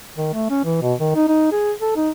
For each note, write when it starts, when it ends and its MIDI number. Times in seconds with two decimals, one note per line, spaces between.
0.18 0.29 51
0.33 0.47 57
0.50 0.63 61
0.65 0.79 52
0.82 0.94 47
1.00 1.12 51
1.15 1.27 63
1.28 1.51 63
1.52 1.72 68
1.81 1.93 69
1.96 2.10 63